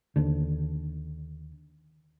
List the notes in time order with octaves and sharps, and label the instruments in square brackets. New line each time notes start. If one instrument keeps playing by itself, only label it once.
[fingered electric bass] D#2 D3